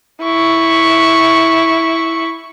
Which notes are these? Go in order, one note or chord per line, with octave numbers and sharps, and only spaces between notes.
E4 C#6